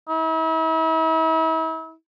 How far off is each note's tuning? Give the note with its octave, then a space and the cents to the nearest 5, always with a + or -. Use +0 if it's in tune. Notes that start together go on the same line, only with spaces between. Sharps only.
E4 -40